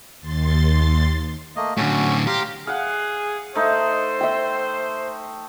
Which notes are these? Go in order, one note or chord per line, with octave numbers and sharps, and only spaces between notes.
D#2 C6 A6
A3 A#3 D#5
A2 D3 C#4 F#4
G4 F5 A#5 C6
G#4 F5 F#5
A3 D#4 C5
E5 G5